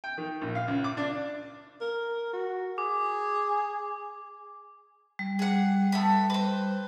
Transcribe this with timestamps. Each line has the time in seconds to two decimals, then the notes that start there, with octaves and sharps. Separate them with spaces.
0.04 G5
0.18 D#3
0.41 A#1
0.55 F5
0.68 C#2
0.84 D6
0.97 D4
1.81 A#4
2.33 F#4
2.78 G#4 D6
5.19 G3
5.39 G#4 F#5
5.92 A3 B3 B5
6.30 B4 C5